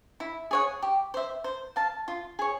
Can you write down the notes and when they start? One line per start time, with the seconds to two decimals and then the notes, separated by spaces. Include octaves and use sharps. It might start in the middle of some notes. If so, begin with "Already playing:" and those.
0.20 E4
0.51 G#4 C#5 F#5
0.82 G4
1.14 C5 E5
1.44 C5
1.76 F5 A5
2.08 F4
2.39 G#4 C#5